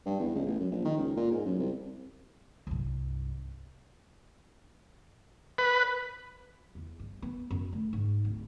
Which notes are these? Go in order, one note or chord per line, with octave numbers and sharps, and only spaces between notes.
G2
E2
C#2
A1
F#2
A#1
D#3
C#2
A#2
G#2
F#2
C2
C2 G2
B4
E2
G2
B3
F#2
A3
G#2
D1